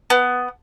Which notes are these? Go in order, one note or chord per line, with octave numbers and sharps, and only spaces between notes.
B3